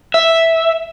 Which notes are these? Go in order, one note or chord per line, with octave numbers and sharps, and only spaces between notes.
E5